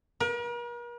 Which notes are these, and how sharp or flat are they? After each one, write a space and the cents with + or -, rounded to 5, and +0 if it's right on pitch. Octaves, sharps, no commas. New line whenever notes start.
A#4 +45